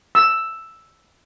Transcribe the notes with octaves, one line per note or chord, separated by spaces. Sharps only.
E6